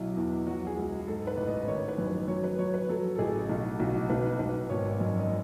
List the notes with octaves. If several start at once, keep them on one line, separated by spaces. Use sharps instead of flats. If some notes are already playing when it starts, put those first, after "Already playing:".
Already playing: B1 F#3 E4
E2
F#3 F#4
G#4
C#2
G#2 A4
B4
A1
D#5
D#3 C#5
B4
F#2
B4
F#3 C#5
B4
F#3 C#5
B4
F#3 A4
A4
A1 G#4
B1 F#4
B1 F#4
B1 B4
B1 B4
G#1 C#5
F#2 D#5
D#5